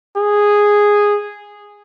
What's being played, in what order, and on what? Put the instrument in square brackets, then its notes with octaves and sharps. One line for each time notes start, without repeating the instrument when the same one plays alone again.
[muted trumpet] G#4